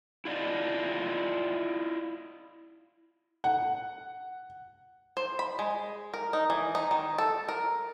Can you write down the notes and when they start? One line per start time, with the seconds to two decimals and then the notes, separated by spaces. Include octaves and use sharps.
0.25 E4 F4 D5 D#5
3.44 F#5
5.17 C5
5.39 B5
5.59 G#3
6.14 A#4
6.33 D#4
6.50 E3
6.75 D#4
6.91 D#3
7.18 A4
7.48 A#4